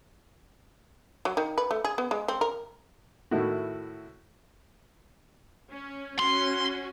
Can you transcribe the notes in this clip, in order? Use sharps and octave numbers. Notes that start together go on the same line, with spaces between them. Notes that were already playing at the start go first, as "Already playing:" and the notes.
F#3
D#3
B4
A3
G#4
B3
G#3
C4
A#4
A2 D#3 E4 F#4
C#4
C#4 F#4 C6